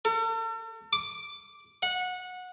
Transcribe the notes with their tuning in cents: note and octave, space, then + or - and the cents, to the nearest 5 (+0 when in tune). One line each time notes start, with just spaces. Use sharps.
A4 +45
D6 -5
F#5 -20